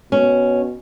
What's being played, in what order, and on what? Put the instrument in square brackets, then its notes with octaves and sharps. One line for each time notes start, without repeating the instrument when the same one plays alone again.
[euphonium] B2 [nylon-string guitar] C#4